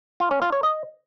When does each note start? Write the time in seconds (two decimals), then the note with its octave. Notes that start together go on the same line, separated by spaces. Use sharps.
0.20 F4
0.31 C#4
0.42 F4
0.52 C#5
0.63 D#5